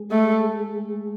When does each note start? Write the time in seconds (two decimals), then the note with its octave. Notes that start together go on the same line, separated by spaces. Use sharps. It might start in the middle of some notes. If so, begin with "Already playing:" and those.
Already playing: G#3
0.11 A3